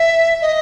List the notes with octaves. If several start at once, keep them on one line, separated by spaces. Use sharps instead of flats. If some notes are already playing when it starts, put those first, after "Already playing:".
Already playing: E5
D#5